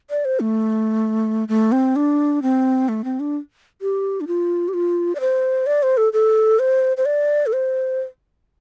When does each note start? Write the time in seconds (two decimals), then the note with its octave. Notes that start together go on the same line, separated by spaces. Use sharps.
0.10 D5
0.25 C5
0.40 A3
1.48 A3
1.72 C4
1.96 D4
2.42 C4
2.89 A3
3.04 C4
3.20 D4
3.82 G4
4.21 D4
4.28 F4
4.68 G4
4.74 F4
5.15 D5
5.20 C5
5.66 D5
5.83 C5
5.97 A4
6.13 A4
6.59 C5
6.97 C5
7.06 D5
7.46 A4
7.53 C5